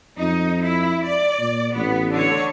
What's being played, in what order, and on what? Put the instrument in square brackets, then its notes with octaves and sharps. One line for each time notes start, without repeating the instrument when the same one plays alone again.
[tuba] F2 [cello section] D#4
[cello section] E4
D5
[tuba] A#2
[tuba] A1 [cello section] B3
[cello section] D3 C#5